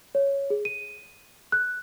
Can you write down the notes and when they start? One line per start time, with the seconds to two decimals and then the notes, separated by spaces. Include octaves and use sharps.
0.15 C#5
0.50 G#4
0.65 D#7
1.52 F#6